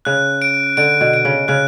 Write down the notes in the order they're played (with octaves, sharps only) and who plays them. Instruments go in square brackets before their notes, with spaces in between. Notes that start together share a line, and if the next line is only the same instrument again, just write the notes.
[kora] C#3 [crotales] F#6
[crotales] D7
[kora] D3 [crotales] D7
[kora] B2
[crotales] D7
[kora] C#3
[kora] C#3 [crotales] F#6